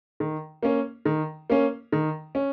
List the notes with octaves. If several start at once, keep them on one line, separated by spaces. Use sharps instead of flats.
D#3
A#3 C#4
D#3
A#3 C#4
D#3
C#4